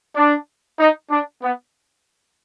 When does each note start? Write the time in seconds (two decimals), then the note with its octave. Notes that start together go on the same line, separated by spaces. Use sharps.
0.15 D4
0.79 D#4
1.11 D4
1.42 B3